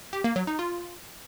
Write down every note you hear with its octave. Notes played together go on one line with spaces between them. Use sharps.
G4
A#3
F#3
D#4
F4